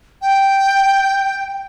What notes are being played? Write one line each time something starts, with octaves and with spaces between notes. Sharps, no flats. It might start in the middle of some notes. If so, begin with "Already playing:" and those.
G5